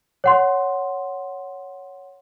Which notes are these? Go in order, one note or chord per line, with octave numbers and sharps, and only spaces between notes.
C#5 F#5 C6